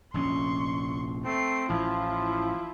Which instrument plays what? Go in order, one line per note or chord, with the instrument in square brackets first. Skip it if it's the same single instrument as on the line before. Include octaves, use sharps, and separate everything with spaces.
[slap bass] F1 A#1 C#4 [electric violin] C6 C#6
[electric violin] A3 C7 [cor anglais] C4
[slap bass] A1 [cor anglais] F3 [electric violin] E4 F4